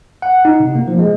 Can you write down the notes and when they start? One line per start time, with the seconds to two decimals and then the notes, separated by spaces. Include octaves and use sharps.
0.22 F#5
0.45 D#4
0.60 C3
0.75 A#3
0.88 F3
0.99 G#3